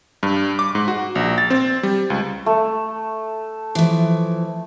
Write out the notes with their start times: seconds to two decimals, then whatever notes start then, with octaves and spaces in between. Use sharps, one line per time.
0.23 G2
0.59 D6
0.75 G#2
0.88 F#4
1.15 A#1
1.38 A6
1.50 C4
1.83 G3
2.10 C#2
2.46 A3
3.75 E3 F3